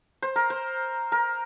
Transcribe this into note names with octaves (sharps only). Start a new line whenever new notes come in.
C5
A#4
C5
A#4